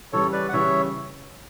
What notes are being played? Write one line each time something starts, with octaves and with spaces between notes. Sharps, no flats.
C#3 E3 G3 C#4 A4 C#5
B4 D5
F#5
C#3 E3 G3 C#4 C#5 E5